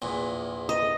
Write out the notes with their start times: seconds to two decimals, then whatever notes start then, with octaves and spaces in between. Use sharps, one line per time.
0.02 A#1 E2 A#2
0.69 D#5